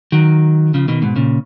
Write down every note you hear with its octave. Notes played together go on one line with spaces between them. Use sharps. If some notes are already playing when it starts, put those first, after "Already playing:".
D#3 F#3
C#3 F3
B2 D#3
G#2 B2
A#2 C#3